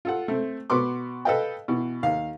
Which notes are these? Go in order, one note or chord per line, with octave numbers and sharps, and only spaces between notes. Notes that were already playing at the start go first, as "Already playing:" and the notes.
F4 A4 F#5
A3 C4
B2 F#4 B4 C6 D6
A4 B4 D#5 F5 G5
B2 E3
D#2 F5